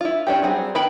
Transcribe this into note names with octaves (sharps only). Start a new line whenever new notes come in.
E4 F4
C#4 D4 G4
F#3 G3 C4 G#4
D#3 B3 E4 G5 B5